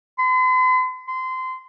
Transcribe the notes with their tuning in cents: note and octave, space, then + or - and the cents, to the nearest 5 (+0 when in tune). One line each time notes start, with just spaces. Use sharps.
C6 -45
C6 -25